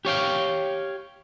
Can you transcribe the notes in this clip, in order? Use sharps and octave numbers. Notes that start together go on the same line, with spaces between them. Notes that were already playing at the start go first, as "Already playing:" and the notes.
G4 C#5 F5 G5